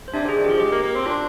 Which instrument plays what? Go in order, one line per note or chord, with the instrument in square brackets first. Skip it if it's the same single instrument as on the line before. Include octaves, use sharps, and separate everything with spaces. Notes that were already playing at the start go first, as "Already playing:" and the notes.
[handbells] C5
[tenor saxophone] C3 [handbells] D4 D5
[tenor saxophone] D3 [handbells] G#4
[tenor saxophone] D#3
[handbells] G4
[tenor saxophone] F3
[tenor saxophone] G#3 [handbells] G4
[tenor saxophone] A#3
A#3
C4
[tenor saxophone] D4 [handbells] F4